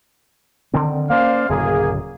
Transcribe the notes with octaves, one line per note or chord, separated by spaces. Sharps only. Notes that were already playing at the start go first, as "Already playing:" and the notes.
D3 D#3 C4
A#3 C#4 C5 D5 F5
D1 F#2 C#3 A#3 G#4